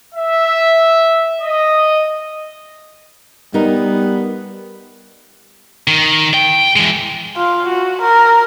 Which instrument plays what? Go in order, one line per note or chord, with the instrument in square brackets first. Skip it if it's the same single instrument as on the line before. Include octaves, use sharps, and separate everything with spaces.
[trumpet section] E5
D#5
[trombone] G3 [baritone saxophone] B3 [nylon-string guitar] D#4 A#4
[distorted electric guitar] D#3
G5
E3 G#3
[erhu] F4
F#4
A#4